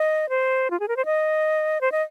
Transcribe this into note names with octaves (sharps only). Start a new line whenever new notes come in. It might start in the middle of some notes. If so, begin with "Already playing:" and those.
Already playing: D#5
C5
F4
G#4
A#4
C5
D#5
C5
D#5